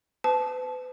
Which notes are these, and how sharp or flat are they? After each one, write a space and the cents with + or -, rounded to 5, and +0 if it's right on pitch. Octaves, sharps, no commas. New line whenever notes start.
B4 +40 A5 -20